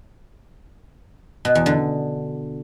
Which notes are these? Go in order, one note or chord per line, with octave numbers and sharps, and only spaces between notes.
B2
E2
D3